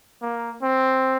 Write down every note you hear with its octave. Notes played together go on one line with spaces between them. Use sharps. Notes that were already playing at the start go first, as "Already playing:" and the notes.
A#3
C4